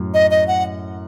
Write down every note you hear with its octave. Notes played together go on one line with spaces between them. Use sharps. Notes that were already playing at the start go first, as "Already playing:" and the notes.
Already playing: F#2 A2
D#5
D#5
F#5